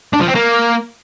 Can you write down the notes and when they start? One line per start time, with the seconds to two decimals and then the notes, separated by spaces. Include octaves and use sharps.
0.13 D4
0.21 F3
0.28 C4
0.35 A#3